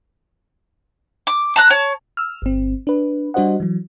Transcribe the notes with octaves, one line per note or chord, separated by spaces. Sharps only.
D6
A5 A#5 F#6
C#5 A5
E6 F6
G1 C4
D4 B4
G3 D4 F#4 C5 D#5 F#5
E3 F#3